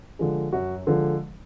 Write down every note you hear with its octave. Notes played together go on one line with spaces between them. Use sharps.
D3 F3 G#3
F#2 F#4
D3 F3 G#3